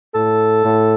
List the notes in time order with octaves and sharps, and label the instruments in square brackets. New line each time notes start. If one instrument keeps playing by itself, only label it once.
[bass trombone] A2 [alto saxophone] A4
[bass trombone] A2